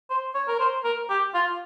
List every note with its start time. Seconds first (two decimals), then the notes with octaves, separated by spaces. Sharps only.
0.10 C5
0.35 C#5
0.48 A#4
0.60 C5
0.85 A#4
1.09 G4
1.34 F4